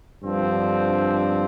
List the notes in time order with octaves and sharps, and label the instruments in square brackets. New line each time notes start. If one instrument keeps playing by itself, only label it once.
[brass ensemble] G2 D3 F3 C4